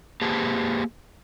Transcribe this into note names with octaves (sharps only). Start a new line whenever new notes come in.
A#3 G4 G#4 B4 C5 A5